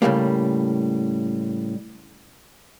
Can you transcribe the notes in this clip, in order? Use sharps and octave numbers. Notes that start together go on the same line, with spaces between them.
A2 C#3 F#3 G3 A#3